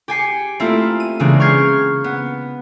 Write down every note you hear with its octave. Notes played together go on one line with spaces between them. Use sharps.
G4 G#5 C7 C#7
A3 A#3 C4 E4 F4
D#7
C#3 E3 G#3 A#3 C4 D4
C#6 F6 G6 G#6 C7
B3